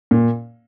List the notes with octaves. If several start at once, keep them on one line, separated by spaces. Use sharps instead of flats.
A#2